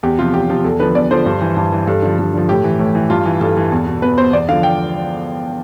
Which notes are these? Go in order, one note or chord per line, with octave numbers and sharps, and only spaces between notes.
E2 G4
C3 F3 F4
E2 G4
C3 F3
E2 A4
D3 F3 B4
E2 D5
D3 F3 C5
G2
E3
G2
E3
G2 A4
D3 F3
G2
D3 F3
A2 G4
E3
A2
E3
G2 F4
E3
G2 A4
E3
E2
B2
E2 B4
B2 C5
E2 D5
D3 F3 F5
G5